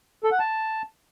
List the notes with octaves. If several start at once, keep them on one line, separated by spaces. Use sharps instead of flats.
A4
F#5
A5